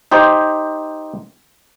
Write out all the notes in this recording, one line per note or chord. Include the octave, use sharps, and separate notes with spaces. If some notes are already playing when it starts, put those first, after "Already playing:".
D#4 G4 C5